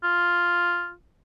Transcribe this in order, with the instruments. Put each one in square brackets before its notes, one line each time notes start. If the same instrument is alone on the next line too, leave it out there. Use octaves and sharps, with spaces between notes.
[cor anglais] F4